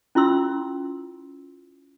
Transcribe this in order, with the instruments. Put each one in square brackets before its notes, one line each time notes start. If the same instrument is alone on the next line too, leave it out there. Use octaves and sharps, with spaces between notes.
[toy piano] C#4 E4 F4 C6 E6